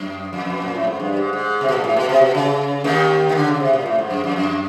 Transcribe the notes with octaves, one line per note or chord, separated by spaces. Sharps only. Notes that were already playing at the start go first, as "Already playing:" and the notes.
Already playing: F#2
F2
B2
A#2
A2
G#2
G2
G#2
G#2
C3
B2
A#2
A2
B2
C3
B2
C#3
D#2 D#3
D#3
D3
C#3
C3
A#2
A2
G#2
F#2
F2
F#2